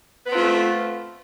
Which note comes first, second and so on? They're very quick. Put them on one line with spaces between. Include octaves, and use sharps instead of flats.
B4 B3 C4 F4 A3